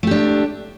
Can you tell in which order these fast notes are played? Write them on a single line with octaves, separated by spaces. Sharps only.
A3 G4 D4